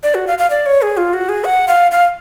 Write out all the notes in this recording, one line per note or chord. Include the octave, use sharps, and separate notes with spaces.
D5
F#4
F5
F5
D5
C#5
G#4
F4
F#4
G#4
F#5
F5
F5